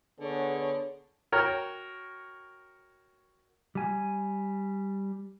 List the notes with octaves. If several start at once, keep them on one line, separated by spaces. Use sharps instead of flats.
D3 B3 G#4 C#5
F#4 A#4 C#5 G5
G3 G#5